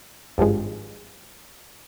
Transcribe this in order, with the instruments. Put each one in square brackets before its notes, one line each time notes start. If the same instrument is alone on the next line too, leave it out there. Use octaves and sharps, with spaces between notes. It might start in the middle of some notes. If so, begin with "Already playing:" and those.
[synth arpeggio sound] G#1 G2 F3 G#3